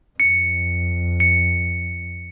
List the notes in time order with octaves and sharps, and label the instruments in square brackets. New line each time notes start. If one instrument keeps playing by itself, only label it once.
[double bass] F2 [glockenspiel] C#7
[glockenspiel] C#7